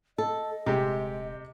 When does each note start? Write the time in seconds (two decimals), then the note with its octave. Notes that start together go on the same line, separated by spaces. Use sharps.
0.18 A4 D#5
0.66 D#1 C3 G#3 G4